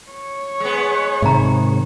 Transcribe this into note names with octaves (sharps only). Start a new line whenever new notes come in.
C#5
G#3 B3
G#2 C3 D#3 E5 A#5